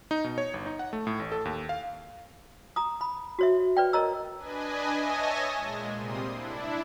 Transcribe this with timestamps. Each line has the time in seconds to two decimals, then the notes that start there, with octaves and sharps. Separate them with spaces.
0.11 D#4
0.24 B2
0.38 C#5
0.54 G1
0.66 D#4
0.79 F#5
0.93 A3
1.07 A2
1.20 A1
1.32 A4
1.45 D#2
1.69 F5
2.76 A#5 D#6
3.01 B5
3.39 F#4 C#5 E5
3.77 B4 D5 G5
3.93 A#4 C#5 D#5 A#5 E6
4.38 D4 B4 D#5 G#5
4.95 C#5 D#5 E5 G#5 A5 A#6
5.57 A#2 G#3
5.98 C3 G3 A#3 C4 C6 D#6
6.28 D4 E4